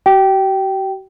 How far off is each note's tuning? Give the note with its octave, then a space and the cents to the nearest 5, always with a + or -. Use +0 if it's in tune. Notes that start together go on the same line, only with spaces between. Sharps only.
F#4 +45 G5 -15